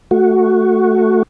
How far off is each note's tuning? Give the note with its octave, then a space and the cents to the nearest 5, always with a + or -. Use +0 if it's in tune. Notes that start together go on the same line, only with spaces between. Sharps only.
A3 +0 F#4 +0